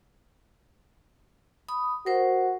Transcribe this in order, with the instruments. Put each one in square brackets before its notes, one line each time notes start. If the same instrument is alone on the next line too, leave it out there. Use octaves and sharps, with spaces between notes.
[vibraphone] B5 D#6
[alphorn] F#4 [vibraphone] A#4 C5